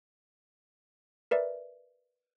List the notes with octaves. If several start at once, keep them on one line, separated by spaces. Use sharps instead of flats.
A#4 B4 D5 E5